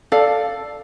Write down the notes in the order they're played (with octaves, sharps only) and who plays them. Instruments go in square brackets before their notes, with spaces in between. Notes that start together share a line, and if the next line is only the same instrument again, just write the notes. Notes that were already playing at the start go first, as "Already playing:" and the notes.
[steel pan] A4 [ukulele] D5 F5